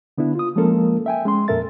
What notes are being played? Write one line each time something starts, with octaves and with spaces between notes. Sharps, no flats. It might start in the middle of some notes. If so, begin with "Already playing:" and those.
D3 B3 D4 E4
F4 D#6
F3 G#3 A#3 C#4 A4 A#4
E5 G5 G#5
G#3 C#4 C6
F2 A#2 A4 A#4 E5 A6